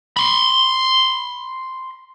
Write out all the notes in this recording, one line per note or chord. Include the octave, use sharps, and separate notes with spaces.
B5 C6